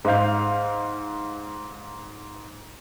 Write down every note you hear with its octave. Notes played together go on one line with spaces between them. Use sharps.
G#2 D#5 F5 G6